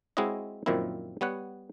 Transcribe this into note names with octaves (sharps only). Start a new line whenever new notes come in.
G#3 C4 E4 F#4 C#5 D#5
F#2 A#2 D#3 F3 C4 E4
G3 B3 C#5 F#5